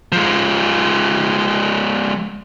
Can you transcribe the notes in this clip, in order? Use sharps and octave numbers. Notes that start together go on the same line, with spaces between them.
F3 G#3